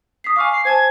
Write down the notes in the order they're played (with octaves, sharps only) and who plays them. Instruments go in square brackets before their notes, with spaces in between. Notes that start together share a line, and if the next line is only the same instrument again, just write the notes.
[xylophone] D#6 B6 C7
[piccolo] F5 [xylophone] G#5 C#6 D6
[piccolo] C7
[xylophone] C5 G#5 A5 [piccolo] G#6